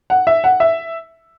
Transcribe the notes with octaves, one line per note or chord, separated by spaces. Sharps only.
F#5
E5
F#5
E5